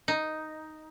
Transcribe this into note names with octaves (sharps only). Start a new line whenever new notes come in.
D#4